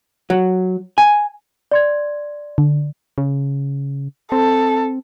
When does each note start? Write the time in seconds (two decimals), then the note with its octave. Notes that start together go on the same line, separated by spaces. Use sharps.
0.30 F#3
0.98 G#5
1.72 D5 C6 G#6
2.58 D3
3.18 C#3
4.32 C4 A4